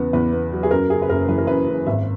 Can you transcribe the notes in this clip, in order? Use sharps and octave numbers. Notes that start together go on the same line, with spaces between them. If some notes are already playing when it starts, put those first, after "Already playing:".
Already playing: E2 C#3 B3
E2 B4
B3
F#3
G#4
F#2 A#4
C#3 G#4
B4
F#1 A#4
E3 B4
A#4
F#2 B4
F#2
G#1 E5